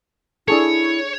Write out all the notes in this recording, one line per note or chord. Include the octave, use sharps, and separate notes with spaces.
D4 E4 G#4 A4 C#5